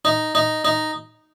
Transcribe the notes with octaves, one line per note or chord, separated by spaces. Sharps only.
D#4
D#4
D#4